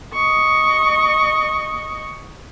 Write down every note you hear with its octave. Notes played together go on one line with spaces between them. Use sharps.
D#5 C#6